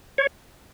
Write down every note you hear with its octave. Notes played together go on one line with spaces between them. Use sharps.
C#5